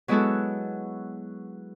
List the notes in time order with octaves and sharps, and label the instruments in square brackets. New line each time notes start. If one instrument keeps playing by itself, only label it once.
[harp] F#3 G#3 B3 E4 F#4 A4